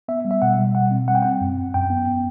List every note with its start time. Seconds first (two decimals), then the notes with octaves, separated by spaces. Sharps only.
0.08 B3 E5
0.25 G3
0.31 E5
0.42 B2 F#5
0.58 G3
0.75 B2 F#5
0.91 C4
1.08 G3 F#5
1.15 G5
1.22 C4 F#5
1.41 F#2
1.58 F#2
1.74 F#2 G5
1.90 B3